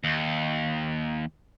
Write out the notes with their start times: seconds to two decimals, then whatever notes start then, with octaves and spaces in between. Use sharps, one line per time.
0.04 D#2